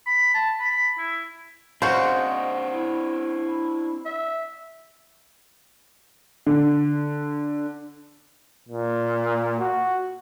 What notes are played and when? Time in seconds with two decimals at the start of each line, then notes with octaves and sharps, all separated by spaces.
0.06 B5
0.34 A5
0.59 B5
0.98 E4
1.82 C#3 C4 D4 F#4 C5 D#5
2.73 E4
4.05 E5
6.47 D3
8.69 A#2
9.59 F#4